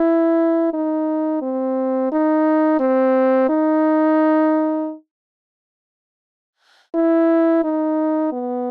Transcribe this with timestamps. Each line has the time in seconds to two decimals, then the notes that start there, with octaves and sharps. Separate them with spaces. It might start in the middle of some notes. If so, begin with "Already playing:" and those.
Already playing: E4
0.73 D#4
1.42 C4
2.12 D#4
2.80 C4
3.49 D#4
6.95 E4
7.64 D#4
8.33 B3